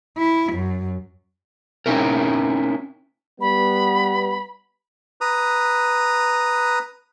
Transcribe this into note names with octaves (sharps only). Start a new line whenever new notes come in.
E4
F#2
C4 C#4 D#4 E4 A#4
G3 B3 B5
B4 A#5 D#6